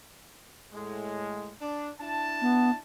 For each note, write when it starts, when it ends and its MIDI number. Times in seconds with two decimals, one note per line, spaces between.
0.73 1.53 45
0.73 1.53 56
1.60 1.90 62
2.00 2.79 62
2.00 2.79 64
2.00 2.79 81
2.41 2.70 59